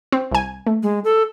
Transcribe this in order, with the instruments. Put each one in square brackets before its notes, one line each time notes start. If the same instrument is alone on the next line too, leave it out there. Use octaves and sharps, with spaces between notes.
[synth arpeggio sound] C4
C2 G#5
A3
[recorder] G#3
A4